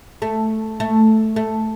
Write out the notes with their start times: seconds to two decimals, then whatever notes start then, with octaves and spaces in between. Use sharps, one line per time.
0.22 A3
0.80 A3
1.36 A3